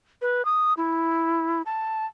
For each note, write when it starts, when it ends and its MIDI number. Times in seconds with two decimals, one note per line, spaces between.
0.22 0.45 71
0.45 0.73 87
0.77 1.62 64
1.66 2.06 81